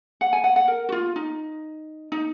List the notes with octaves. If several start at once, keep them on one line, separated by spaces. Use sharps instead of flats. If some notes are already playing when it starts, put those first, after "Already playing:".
F#5
G#5
F#5
F#5
A#4
F#4
F4
D#4
D#4